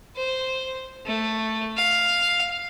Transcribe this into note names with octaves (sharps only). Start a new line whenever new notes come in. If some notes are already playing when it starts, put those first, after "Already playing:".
C5
A3
F5